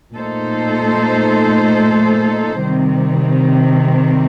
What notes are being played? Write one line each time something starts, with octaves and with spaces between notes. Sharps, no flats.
A#2 A3 D#4 A4 C5
C3 D#3 G3 C4